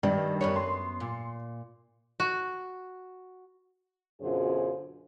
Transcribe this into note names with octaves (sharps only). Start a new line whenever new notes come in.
G2 D#3 D4
F#2 B3 C#5
C6
A#2
F#4
F#2 B2 D3 F4 G#4 C5